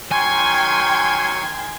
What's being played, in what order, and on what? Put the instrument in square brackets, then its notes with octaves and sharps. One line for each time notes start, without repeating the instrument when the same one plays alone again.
[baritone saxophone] D#3 [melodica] F#3 C#6 [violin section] G5 C6 G#6 [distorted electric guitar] G#5